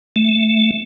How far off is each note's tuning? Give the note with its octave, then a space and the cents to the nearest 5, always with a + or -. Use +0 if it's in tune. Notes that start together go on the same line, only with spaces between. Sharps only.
A3 -5